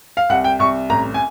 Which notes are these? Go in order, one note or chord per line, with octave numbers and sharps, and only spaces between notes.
F5
C2 F#5
G5
C2 C#6
A1 A#5
G#5